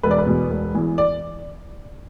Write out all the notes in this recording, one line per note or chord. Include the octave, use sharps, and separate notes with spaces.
E1 B4
D5
B4
E2 B2
E1
E2 E3
D5